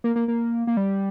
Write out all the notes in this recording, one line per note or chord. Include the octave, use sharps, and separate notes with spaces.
A#3
A#3
A#3
A#3
G3